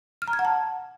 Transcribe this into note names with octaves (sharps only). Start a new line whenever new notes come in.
F6
A#5
G#6
F#5
A5